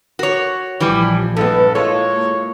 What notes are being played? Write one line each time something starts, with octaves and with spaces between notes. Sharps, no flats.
F#4 A#4 C#5
A#1 A#2 E3 F3 G3
G2 E3 G#3 B3 A4
G#3 A#3 E4 F4 A4 C#5